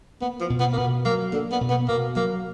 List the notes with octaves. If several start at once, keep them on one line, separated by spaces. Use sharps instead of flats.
A#3 B3
F3
B2
B3
A#3
B2 B3
F#3 A#3
D3 A#3
B3
B2
B3
B2 A#3
F#3 A#3